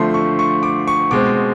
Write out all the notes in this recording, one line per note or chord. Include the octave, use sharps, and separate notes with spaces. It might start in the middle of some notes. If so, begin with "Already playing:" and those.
Already playing: D3 F3 A3 C4 C6
C#6
C#6
D6
C#6
B2 G#3 C4 D6